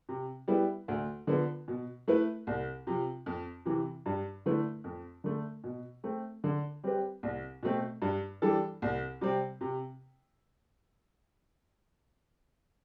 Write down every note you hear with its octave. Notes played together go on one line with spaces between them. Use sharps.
C3
G3 B3 E4
D2
D3 F3 B3
B2
A3 E4 B4
C2
C3 F3
F2
C3 E3
G2
D3 A3 E4 B4
F2
D3 A3
B2
A3 C4
D3
G3 C4 G4 B4
C2
B2 A3 C4
G2
E3 G3 D4 A4
C2
C3 G3 C4
C3